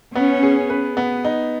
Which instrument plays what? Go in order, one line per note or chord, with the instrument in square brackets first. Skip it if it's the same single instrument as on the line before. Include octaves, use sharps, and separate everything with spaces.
[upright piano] B3 [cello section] C#4
[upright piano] G#4
B4
B3
D#4